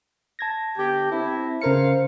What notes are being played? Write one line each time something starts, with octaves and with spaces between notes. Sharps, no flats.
A5 G#6 A#6
D3 B3 G4
C4 E4
C#3 A#4 C5 F5 C#7